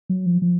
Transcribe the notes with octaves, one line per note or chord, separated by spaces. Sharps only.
F#3
F3
F3